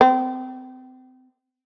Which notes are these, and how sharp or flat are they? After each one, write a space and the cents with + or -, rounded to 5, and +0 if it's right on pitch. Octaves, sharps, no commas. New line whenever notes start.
C4 -30